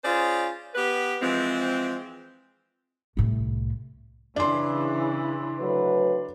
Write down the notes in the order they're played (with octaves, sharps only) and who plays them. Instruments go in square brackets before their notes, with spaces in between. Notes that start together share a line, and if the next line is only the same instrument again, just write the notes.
[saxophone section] C#4 F4 G#4 C5 D5
B3 G4 B4
E3 F3 G#3 C4
[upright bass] C2 A2
[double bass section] C#3 E3 [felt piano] D4 C6
[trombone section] D2 F#3 B4